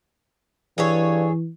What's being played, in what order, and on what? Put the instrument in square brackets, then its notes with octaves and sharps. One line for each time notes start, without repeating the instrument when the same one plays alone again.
[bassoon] G2 [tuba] E3 [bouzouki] G#4 A4 C#5